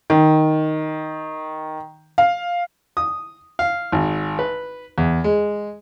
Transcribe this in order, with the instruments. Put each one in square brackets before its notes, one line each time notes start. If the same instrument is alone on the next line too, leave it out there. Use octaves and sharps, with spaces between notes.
[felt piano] D#3
F5
[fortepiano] D#6
F5
G#1
B4
E2
G#3